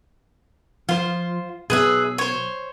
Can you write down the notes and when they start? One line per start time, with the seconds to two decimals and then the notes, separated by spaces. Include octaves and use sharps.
0.89 F3 F4 C5
1.70 B2 F#3 G#4 B4 E5
2.18 C5 C#5